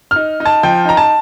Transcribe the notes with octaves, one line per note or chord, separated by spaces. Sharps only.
D#4 F6
D#4
A5
F3 G5
D#4 A#5
A5